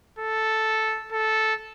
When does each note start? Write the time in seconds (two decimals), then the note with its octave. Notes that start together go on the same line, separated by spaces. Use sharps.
0.19 A4
1.12 A4